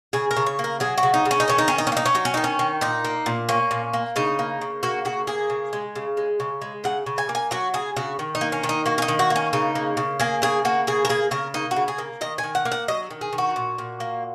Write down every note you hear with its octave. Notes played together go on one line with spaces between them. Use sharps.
C#3 G#4
A#4
C#3
C#5
A#3
A#4
F#3 G#4
F#4
C#3
D#4
C#3
C#4
D#4
D#3 C#4
D#4
D#3 C#4
D#4
C#4
A#3 D#4
C#4
F#3 D#4
C#4
D#3 D#4
C#4
D#3
A#2 D#4
A#3
A#2
A#3 C#4
A#2
A#3
C#3 D#4
A#3
C#3
A#3 F#4
C#3 F#4
A#3 G#4
C#3
G#3
C#3
G#3
C#3
G#3
C#3 F#5
C#3
G#5
A#3
G#5
F#3 F#4
C#3 G#4
C#3 F#4
D#3
D#4
A#3
C#4
D#3
D#4
A#3 F#4
C#4
D#4
D#3
F#4
A#3
C#4
C#3 D#4
A#3
C#3
A#3 G#4
C#3 G#4
A#3 F#4
C#3 G#4
A#4
A#3 G#4
C#3 A#4
A#3 D#4
F#4
C#3
G#4
A#3
D#3 D#5
G#5
D#3
F#5
A#3
F#5
F#3 D#5
D#3
G#4
D#3
F#4
A#2
A#2
A#3